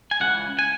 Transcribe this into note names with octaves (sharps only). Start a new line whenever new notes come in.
G#5
C#2 C#3 E3 F#5
G#5